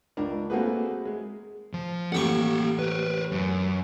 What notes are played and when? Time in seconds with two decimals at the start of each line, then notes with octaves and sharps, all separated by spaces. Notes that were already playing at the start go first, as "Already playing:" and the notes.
0.17 C#2 D4 A#4
0.50 A3 A#3 C4 F#4 G#4 B4
1.06 G#3
1.74 F3
2.12 A1 A#3 G4 F#5 C#6
2.79 A#4 B4
3.32 F#2